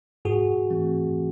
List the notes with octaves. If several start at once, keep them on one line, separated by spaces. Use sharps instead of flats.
G#2 F#4 G#4
E3 A3 C4